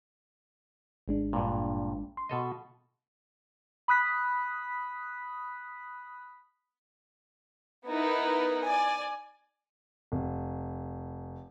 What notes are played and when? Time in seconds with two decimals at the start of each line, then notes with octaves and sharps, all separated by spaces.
1.08 G#1 G#3 D4
1.33 G2 A#2
2.17 C6
2.29 B2 A4 D#5
3.88 B5 D#6 F#6 B6
7.88 B3 D#4 E4 A#4 B4
8.63 D5 G#5
10.12 F1